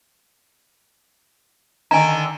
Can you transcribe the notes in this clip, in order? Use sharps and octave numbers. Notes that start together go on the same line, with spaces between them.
D3 D#3 D#4 G#5 A#5